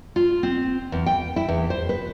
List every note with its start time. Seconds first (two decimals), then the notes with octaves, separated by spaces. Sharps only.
0.16 F4
0.43 C4
0.92 E2
1.06 G5
1.36 E4
1.48 E2
1.70 C5
1.89 B4